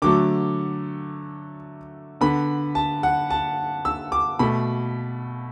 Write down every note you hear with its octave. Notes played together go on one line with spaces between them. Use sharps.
D3 F#3 A3 D6
D3 B3 B5
A5
F#5
A5
E6
D6
B2 A3 B5